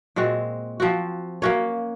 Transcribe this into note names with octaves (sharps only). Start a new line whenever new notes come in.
A#2 G#3 C4 F#4
F3 C4 F#4
A#3 C#4 F#4 C#5